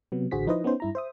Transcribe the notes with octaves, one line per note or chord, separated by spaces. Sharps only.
C3 F#3 B3
A1 D3 F#4 G#4 C5 B6
F3 D#4 E4 B4 C5 D#5
B3 C#4 D#4 C5
G2 E4 A#5
C5 E5 D#6